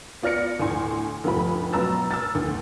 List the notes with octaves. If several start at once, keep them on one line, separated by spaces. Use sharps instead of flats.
B3 F4 D5 F6 A#6 C#7
D2 A2 G#5 C6
F1 D2 G2 F4 B5
B2 F#3 B4 A#5 E6 A6
E6 F6 A6
D2 A2